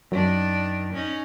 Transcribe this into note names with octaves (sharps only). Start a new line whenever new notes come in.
F#2 D#3 D4
C#4 D#4